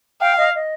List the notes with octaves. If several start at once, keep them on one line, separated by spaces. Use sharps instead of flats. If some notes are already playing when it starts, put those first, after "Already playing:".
F5 G5
D#5
D#5